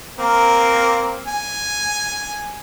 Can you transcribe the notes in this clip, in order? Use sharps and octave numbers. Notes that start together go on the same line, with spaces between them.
A#3 C4 A#4
G#5